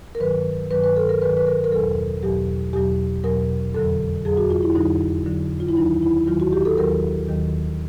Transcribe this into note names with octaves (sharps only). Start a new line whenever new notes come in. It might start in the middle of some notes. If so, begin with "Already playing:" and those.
A#4
G2 D#3 F#3 B4
G2 D#3 F#3 B4
B4
A4
A#4
G2 D#3 F#3 B4
B4
A#4
A#4
E2 B2 F#3 A4
E2 B2 F#3 G4
E2 B2 F#3 G4
E2 B2 F#3 A#4
F2 D3 F#3 A4
F2 D3 F#3 G#4
F#4
F4
E4
F2 D3 F#3 D#4
F2 D3 F#3
F4
E4
D#2 D#3 F#3 D#4
E4
D#2 D#3 F#3 F4
F#4
G4
A4
D#2 D#3 F#3 A#4
D#2 D#3 F#3